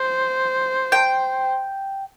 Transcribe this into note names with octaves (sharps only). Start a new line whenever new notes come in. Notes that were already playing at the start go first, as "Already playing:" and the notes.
Already playing: C5
G5